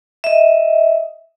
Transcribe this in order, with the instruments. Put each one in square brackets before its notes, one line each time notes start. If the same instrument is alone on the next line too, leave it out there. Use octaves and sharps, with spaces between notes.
[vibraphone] D#5 E5